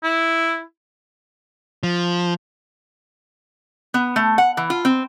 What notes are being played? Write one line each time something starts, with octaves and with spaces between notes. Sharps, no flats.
E4
F3
B3
A3
F#5
E3
F4
C4